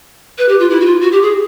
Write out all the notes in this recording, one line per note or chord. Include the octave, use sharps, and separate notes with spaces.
B4
G4
F4
E4
F#4
F4
F#4
G4
G#4